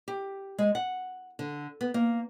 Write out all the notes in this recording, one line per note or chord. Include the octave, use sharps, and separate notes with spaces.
G4
G#3
F#5
D3
B3
A#3